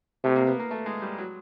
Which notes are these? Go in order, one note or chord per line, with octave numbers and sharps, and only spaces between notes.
C3 A3
A#3
B3
A#3
A3
G#3
G3
F#3